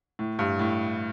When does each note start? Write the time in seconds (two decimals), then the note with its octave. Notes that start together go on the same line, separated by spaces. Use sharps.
0.19 A2
0.39 G2
0.59 A2